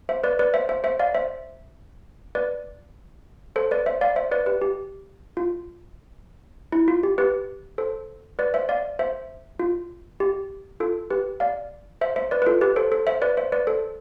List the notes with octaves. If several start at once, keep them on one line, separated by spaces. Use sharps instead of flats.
C5 E5
B4 D5
B4 D5
C5 E5
C5 E5
C5 E5
D5 F5
C5 E5
B4 D5
A4 C5
B4 D5
C5 E5
D5 F5
C5 E5
B4 D5
G4 B4
G4
F4
E4
F4
G4
G4 B4
A4 C5
B4 D5
C5 E5
D5 F5
C5 E5
F4
G4
F4 A4
G4 B4
D5 F5
C5 E5
C5 E5
B4 D5
B4
F4 A4
G4 B4
A4 C5
A4 C5
C5 E5
B4 D5
C5 E5
B4 D5
A4 C5